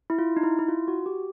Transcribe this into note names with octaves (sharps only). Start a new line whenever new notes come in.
E4
F4
D#4
E4
E4
F4
F#4
G4